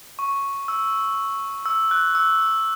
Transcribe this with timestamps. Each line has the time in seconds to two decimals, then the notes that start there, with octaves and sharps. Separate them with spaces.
0.19 C#6
0.68 E6
1.66 E6
1.91 F#6
2.15 E6